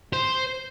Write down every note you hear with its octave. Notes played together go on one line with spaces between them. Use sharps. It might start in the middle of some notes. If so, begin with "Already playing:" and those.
C5